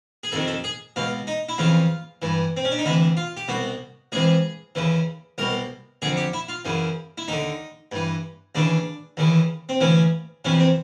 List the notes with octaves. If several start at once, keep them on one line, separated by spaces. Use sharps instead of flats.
G#4
F2 C3 D#3 A4
A4
G#4
C#2 B2 F4
D#4
E4
F2 C#3 E3 F4
G2 E3
C4
C#4
D4
D#4
D2 C3 E3 E4
F4
G4
C2 B2 F#4
C#2 C3 E3 G#4
D#2 C#3 E3
C2 B2 A#4
F2 D3 G#4
G4
E4
F4
F#2 C#3 E3
E4
D#2 D3 D#4
G2 E3
D#2 C#3 E3 D4
D#2 C#3 E3
C4
D2 C#3 E3 C#4
F2 C3 E3 C#4
C4